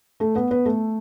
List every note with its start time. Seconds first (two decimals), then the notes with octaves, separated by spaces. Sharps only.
0.20 A3 A4
0.35 B3 B4
0.51 B3 B4
0.66 A3 A4